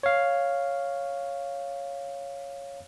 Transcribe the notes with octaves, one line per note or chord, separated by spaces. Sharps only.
C#5 F5